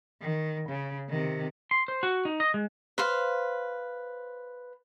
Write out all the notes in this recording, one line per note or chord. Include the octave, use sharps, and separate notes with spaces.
D#3
C#3
C3 D#3
C6
C5
F#4
D#4
D#5
G#3
B4 C5 F5